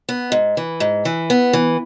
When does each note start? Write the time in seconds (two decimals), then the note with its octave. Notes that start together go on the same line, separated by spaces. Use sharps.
0.09 B3
0.32 G#2
0.57 E3
0.80 G#2
1.05 E3
1.30 B3
1.53 E3